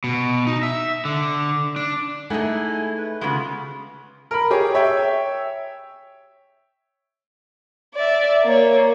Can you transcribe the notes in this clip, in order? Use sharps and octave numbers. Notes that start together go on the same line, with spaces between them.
B2
D#4
E5
D3
D4
A3 D#4 E4 G#4 D#5 F#5 G#5
B4
C#3 G#3 B3 F4 F#4
A#4 B5
G4 G#4 C#5
C#5 E5 G5
D5 E5
A#3 C#5